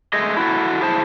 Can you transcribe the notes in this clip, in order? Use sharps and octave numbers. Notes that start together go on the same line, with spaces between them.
A3 G#4 D#5
E4 F#4 A4
E4 G#4 C5 A5